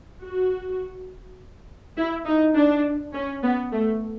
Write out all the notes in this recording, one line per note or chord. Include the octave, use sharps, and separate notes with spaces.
F#4
E4
D#4
D4
C#4
B3
A3